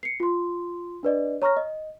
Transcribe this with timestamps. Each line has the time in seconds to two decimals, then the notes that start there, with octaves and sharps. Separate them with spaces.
0.03 C7 C#7
0.20 F4 C6
1.03 D4 B4 D5 D#5
1.42 C#5 A#5 C#6 F6 A#6
1.57 D#5